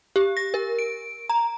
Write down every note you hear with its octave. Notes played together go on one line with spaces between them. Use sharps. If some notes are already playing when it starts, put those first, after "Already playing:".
G4
A#6
A#4
D7
A#5